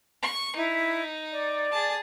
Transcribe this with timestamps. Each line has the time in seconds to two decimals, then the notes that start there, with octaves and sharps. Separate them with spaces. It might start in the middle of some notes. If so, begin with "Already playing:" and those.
0.22 C#6
0.56 D#4 E4
1.32 D5
1.72 G#4 A5